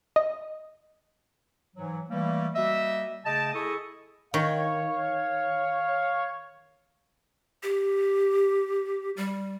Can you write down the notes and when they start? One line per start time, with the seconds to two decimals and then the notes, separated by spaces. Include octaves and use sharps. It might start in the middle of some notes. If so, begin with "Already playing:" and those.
0.16 D#5
1.76 G#2 E3 F#3
2.10 E3 G3 A3 A#3
2.55 G3 A#3 F#4 D#5 E5
3.25 C#3 A3 D#5 G5 A5
3.53 E4 G#4 A4 D#5 C#6 D#6
4.34 D#3 C#5 F5
7.63 G4
9.17 G3